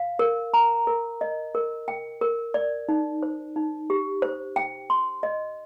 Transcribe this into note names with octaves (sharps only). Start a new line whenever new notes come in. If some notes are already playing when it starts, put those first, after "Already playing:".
Already playing: F5
A#4
A#5
A#4
D#5
A#4
G5
A#4
D5
D#4
C5
D#4
G4
C5
G5
C6
D#5